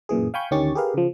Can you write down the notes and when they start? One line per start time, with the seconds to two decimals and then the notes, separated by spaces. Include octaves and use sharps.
0.09 F#2 A#2 E3 G#4
0.34 F5 G5 G#5 B5 C#6 G6
0.51 D2 D#3 C#4 G4 C#6 A6
0.75 G4 G#4 A#4 B4 F5
0.94 C#3 F3